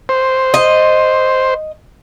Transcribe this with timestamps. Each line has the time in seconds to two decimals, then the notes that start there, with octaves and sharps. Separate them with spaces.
0.09 C5
0.54 D#5